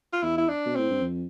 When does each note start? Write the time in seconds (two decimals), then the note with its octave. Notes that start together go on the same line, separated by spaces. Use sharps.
0.13 F4
0.23 E2 E4
0.38 E4
0.48 D4
0.66 B2
0.76 A2 C4
0.90 G2
1.02 F2